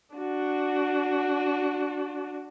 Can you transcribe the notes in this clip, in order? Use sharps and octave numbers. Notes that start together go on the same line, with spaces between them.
D4 F#4